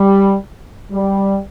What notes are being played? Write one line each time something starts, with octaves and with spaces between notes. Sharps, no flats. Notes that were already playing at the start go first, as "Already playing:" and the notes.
Already playing: G3
G3